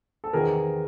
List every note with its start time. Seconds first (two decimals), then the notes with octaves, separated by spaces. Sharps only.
0.24 A4
0.33 E2 C3 D#3 G#4 A#4